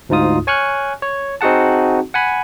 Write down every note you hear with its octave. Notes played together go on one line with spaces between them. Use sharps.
D2 G#2 D#4 F4 D#6
C#5 G#5 C#6 F6 F#6
C#5
C4 D#4 F#4 G#4 F#5 A5
F#5 G#5 B5